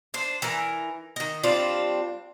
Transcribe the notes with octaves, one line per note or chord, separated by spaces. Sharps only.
D4 C5
E3 A#4
D#3 D#5
G3 C4 D4 F4